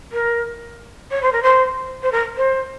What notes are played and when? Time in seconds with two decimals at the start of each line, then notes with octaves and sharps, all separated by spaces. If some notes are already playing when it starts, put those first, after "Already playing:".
0.12 A#4
1.11 C#5
1.22 C5
1.32 A#4
1.42 C5
2.02 C5
2.11 A#4
2.36 C5